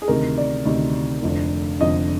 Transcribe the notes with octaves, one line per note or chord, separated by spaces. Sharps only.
G#4
D2 C3 D#3 A#4
D5
D2 C3 D#3
F1 F2 D3
F1 F2 D3 D#5